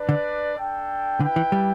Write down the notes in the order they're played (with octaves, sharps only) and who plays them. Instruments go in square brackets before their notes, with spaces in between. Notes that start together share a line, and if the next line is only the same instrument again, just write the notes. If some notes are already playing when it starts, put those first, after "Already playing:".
Already playing: [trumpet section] D4 B4 D5
[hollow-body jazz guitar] D3
[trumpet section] D4 A4 G5
[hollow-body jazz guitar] D3 [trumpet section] E4 B4 G5
[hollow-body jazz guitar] E3
G3